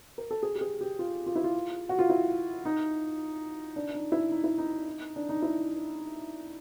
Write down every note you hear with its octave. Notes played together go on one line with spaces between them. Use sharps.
A#4
A4
G#4
G4
G#4
G4
F4
F4
E4
F4
F#4
F4
E4
D#4
D4
D#4
E4
D#4
E4
D#4
D4
D#4
E4